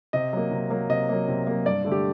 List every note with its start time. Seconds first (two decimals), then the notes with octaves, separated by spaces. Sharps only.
0.13 C3 D#5
0.33 F#3 A#3
0.51 C3
0.70 F#3 A#3
0.89 C3 D#5
1.09 F#3 A#3
1.28 C3
1.47 F#3 A#3
1.66 G2 D5
1.85 D3 A3
1.92 G4